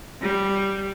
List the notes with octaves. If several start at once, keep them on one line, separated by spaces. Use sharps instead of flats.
G3